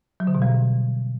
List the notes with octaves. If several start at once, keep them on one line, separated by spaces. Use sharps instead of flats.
F#3
D3
B2
G3